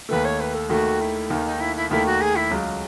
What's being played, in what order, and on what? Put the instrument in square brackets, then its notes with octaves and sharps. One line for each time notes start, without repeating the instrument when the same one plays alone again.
[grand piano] D#2 D#3 A3 [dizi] B4
[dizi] C#5
B4
A4
[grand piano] D#2 D#3 A3 [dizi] F#4
[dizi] E4
[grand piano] D#2 D#3 A3 [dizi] D#4
[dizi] D#4
E4
E4
[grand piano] D#2 D#3 A3 [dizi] E4
[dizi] F#4
G#4
E4
[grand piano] C#2 C#3 F#3